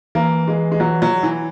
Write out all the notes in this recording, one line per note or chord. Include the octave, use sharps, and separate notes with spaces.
E3 A#3
G#3
G#3
F#3
F#3
E3